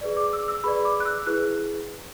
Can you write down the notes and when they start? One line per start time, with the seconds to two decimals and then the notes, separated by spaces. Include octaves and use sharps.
0.01 G#4 B4 D5
0.17 D6
0.33 E6
0.48 E6
0.64 G#4 B4 D5 B5
0.85 D6
1.00 F#6
1.05 E6
1.26 E4 G#4 B4 F#6